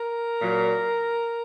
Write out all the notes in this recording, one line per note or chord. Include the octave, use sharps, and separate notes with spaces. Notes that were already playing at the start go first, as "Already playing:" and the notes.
Already playing: A#4
A#2 F#3